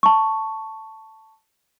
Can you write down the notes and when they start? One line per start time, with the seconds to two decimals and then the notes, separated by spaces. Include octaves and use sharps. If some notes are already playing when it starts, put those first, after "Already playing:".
0.03 A5 C#6